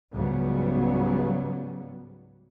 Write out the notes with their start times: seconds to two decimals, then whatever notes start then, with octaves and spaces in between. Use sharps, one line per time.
0.11 C#2 G#2 C#3 F#3 G3 B3